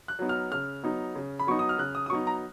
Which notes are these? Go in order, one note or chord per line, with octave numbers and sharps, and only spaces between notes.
F#6
F#3 B3 D#4
F6
C#3 F6
F#3 B3 D#4
C#3
B5
F#3 B3 D#4 C#6
D#6
F6
C#3 F#6
D#6
D#6
F#3 B3 D#4 C#6
A#5